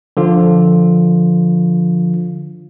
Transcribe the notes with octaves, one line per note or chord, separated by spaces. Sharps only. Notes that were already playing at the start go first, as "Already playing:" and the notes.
D3 F3 F4